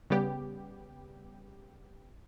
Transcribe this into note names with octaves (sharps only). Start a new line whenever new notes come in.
C#3 G3 B3 G4